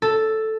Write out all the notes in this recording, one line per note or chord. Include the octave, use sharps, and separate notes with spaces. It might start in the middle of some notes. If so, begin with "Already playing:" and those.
A4